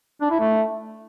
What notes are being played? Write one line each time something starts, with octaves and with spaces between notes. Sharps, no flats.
D4
E4
A3